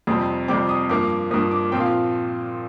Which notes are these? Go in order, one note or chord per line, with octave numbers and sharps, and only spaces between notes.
F2 C3 G3 C4 D#6
F2 C3 G3 C4 D6
D#6
G2 F3 A#3 D6
G2 F3 A#3 D#6
D6
A#2 F3 C4 G5
F5